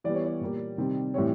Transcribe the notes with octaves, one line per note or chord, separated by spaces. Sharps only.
E3 G3 B3 D5
C#5
D5
A#2 G3 A#3
C3 D#3 G3 C4
A2 E3 G3 C4 C#5